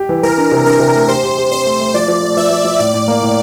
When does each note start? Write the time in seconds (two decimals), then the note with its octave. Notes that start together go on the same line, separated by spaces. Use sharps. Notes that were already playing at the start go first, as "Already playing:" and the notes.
Already playing: G4
0.09 E3
0.23 E3 A#4
0.38 D4
0.51 C3
0.66 D4 A#4
0.79 C3
0.95 A3
1.08 G4 C5
1.23 G4
1.37 G4
1.51 C4 C5
1.66 A3
1.80 A3
1.94 F3 D5
2.08 F3
2.23 A3
2.37 F3 E5
2.51 F3
2.65 F3
2.79 A2 D5
2.94 A2
3.08 A#3
3.22 A2